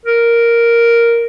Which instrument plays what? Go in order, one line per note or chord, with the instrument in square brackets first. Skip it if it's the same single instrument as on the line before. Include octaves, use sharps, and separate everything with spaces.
[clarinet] A#4